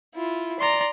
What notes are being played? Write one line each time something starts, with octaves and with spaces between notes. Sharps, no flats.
E4 F4
D5 A#5 C6